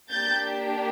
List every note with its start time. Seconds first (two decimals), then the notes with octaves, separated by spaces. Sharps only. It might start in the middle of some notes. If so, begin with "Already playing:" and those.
0.10 A#3 D4 G4 G6 A6